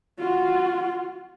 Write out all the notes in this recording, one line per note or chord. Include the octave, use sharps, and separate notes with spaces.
F4 F#4